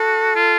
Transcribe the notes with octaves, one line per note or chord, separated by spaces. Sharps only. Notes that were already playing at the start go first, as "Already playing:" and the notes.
Already playing: F#4 A4
F4